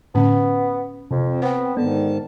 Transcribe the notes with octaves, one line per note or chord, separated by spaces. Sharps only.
A2 D3 B3 C#4
F2 C3
C4
B3 C5 G5
G#2 D3 D#3 B3 A5